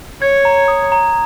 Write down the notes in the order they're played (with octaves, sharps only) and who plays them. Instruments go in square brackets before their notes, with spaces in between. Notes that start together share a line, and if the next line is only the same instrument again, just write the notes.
[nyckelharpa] C#5 [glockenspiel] G#6
[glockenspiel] A#5
D#6
A#5